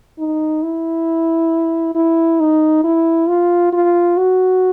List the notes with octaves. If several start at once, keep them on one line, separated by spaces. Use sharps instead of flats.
D#4
E4
E4
D#4
E4
F4
F4
F#4